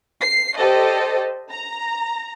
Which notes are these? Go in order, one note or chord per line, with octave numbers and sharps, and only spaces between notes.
C7
G4 A4 C5 D5 D#5
A#5